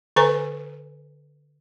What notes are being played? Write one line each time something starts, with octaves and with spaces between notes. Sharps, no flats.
D3 A4 B4 C5 G#5 A#5